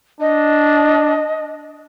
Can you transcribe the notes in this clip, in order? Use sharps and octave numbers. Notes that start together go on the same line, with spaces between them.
D4 D#5